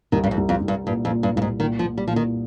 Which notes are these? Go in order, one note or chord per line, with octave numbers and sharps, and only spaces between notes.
C2 D#3
G2
F2
C2
F2
C2
G2
G2 A#2
F2
A#2
G2
C2 G2
G#2
A#2 D#3
F3
A#2
G3
A#2 F3
D#3